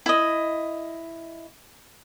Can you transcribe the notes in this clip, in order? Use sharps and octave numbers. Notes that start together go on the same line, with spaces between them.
E4 D#5